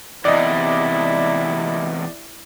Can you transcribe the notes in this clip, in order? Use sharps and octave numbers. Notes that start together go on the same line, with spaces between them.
E2 C3 E4 D5 D#5